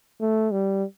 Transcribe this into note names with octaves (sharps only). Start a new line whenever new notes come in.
A3
G3